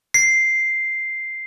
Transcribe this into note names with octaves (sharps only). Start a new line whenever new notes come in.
C7